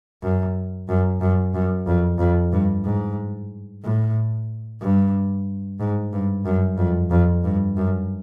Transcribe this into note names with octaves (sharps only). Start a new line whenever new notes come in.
F#2
F#2
F#2
F#2
F2
F2
G2
G#2
A2
G2
G#2
G2
F#2
F2
F2
G2
F#2